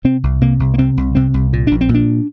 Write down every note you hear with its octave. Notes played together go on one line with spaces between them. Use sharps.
C3 C4
C2
C3 A#3
C2
A#3
C3 C4
C2
C3 C4
C2
A#2
A#1 D4
C4
A#2
D4